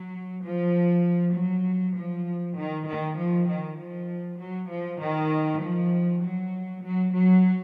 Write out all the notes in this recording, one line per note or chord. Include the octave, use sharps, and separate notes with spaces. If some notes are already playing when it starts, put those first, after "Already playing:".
Already playing: F#3
F3
F#3
F3
D#3
D#3
F3
D#3
F3
F#3
F3
D#3
F3
F#3
F#3
F#3